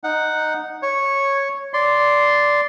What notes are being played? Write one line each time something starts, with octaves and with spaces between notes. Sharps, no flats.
D#4 F#5
C#5
D5 C6